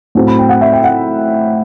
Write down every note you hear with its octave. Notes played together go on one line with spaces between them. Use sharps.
A2 F#3 A3 C4
B5
G5
F#5
E5
G5
F#5